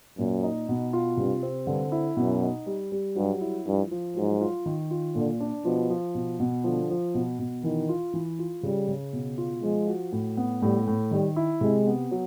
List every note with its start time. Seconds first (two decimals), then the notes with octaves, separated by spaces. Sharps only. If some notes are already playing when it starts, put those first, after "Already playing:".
0.18 F#2 A#2
0.43 D#4
0.69 B2
0.93 F4
1.17 G2 C3
1.43 C4
1.67 G2 D3
1.92 E4
2.17 F#2 B2
2.42 D#4
2.66 G3
2.92 G3
3.16 G2 F#3
3.41 E4
3.66 G2 F3
3.91 F3
4.16 G#2 F#3
4.41 F4
4.66 D#3
4.91 F4
5.15 A#2 D3
5.40 D4
5.65 B2 F3
5.90 F3
6.15 B2
6.40 B2
6.64 D3 F3
6.90 F3
7.15 B2
7.39 B2
7.63 D#3 E3
7.89 F4
8.13 E3
8.39 F4
8.63 C#3 G3
8.88 C#3
9.13 B2
9.38 F4
9.62 F3 G#3
9.87 F#4
10.12 A2
10.37 B3
10.62 A2 G3
10.87 A2
11.11 D#3 G3
11.36 E4
11.61 C3 G#3
11.87 B3
12.11 F#3